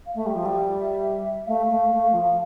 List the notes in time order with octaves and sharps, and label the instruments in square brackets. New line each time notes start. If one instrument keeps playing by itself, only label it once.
[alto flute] F5
[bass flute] A3 [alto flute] E5
[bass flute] G3
F3
G3
[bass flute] A3 [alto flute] F5
[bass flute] A3
A3
F3